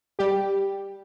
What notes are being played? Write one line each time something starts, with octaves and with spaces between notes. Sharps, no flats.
G3 G4